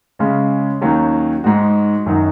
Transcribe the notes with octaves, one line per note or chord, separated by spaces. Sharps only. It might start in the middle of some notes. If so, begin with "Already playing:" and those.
C#3 G#3 C#4
D#2 D#3 F#3 C#4
G#2 G#3 D#4 F#4
F#2 D#3 F#3 D#4 F#4